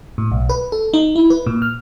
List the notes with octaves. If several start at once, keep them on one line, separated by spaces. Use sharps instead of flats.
A2
B1
B4
A4
D#4
E4
B4
A#2
F6